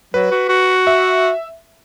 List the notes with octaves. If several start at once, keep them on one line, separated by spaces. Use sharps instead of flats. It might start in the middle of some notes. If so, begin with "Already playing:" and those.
F#3 B4
F#4
F#4
E5